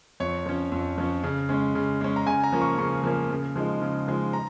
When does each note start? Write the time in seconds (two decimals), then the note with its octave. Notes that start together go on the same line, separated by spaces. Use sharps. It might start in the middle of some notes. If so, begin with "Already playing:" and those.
0.20 F2 C#5
0.46 F3 C#4
0.72 F2
0.98 F3 C#4
1.23 C#3
1.49 G#3 C#4
1.75 C#3
2.01 G#3 C#4
2.16 A#5
2.27 C#3 G#5
2.44 A#5
2.52 F3 A#3 C#4
2.61 C#6
2.78 C#3 C#6
3.04 F3 A#3 C#4
3.30 C#3
3.56 F3 G#3 D#4
3.82 C#3
4.08 F3 G#3 D#4
4.33 A#5